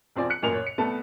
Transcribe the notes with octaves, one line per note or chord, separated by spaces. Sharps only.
E1 C4 F4 D5 G#5
F#6 C#7
A1 F#2 A#2 A#4 G#5 F7
C#5
C#7
C2 A3 B3 A5